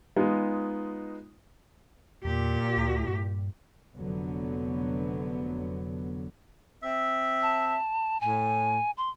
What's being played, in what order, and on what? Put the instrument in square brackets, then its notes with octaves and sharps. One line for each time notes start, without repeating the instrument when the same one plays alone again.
[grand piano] G#3 B3 D#4 F4
[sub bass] E2 [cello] A#2 G4
[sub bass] D2
G2
[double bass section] F1 D3 F#3 B3
[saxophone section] C4 E5
[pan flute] A5
[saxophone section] A2 [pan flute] G#5
[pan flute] C6